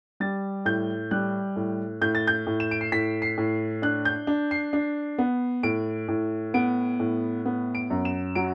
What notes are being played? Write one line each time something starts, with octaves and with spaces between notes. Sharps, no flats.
G3 A6
A2 G6
G3 F#6
A2
A2 G6
A6
G6
A2
E7
D7
C7
A2 B6
C7
A2
D4 F#6
G6
D4
C7
D4
B3
A2 D7
A2
B3 D7
A2
B3
D7
F#2
E7
F#3 D7